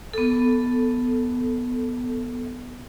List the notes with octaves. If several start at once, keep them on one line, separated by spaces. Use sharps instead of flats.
B3 A4